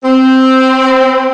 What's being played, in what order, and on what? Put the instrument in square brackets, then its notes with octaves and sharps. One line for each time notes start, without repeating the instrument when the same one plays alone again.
[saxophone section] C4